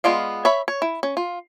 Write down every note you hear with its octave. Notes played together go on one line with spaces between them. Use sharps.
G#3 B3 F4 D5 F5
C#5 E5 B5
C#5
E4
C#4
F4